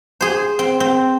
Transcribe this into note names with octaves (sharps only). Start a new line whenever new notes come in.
G#4 C5
C4
C4